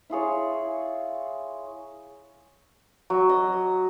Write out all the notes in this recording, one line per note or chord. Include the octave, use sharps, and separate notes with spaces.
E4 F4 G#4 C#5
F#3
D#5